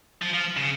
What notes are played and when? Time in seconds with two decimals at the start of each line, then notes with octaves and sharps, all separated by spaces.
0.22 F3
0.33 F3
0.57 C#3